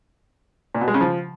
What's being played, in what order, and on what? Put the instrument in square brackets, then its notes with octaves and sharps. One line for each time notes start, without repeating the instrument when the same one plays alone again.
[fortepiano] A#2
B2
G#3
C#3
F3